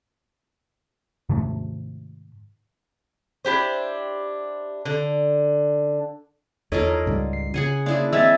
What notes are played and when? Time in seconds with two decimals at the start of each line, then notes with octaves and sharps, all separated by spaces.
1.29 G#2 C3 D#3 A3
3.45 D4 E4 G4 C5
4.85 D3
6.72 E2 D#4 F4 A4 A#4 C#5 D#5
7.06 C#2 G#2 G3
7.33 C7
7.54 C#3 G#4 F#5 G#5
7.86 A#3 D4 E4 G#4
8.13 E3 G#3 C4 E5 E6 G#6 A6